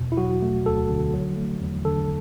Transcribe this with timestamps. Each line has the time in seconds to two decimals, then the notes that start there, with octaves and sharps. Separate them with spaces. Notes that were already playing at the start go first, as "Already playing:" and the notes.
Already playing: E2 B2
0.12 E4
0.17 F#3 F#4
0.42 A3
0.65 D2 A4
0.89 D3
1.14 F#3
1.37 A3
1.61 E2
1.85 D3 A4